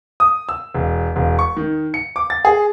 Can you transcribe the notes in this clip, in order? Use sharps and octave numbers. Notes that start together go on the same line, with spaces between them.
D#6
E6
E1
E1
C#6
D#3
C#7
D6
A6
G#4